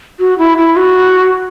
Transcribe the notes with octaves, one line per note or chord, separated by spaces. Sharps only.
F#4
E4
E4
F#4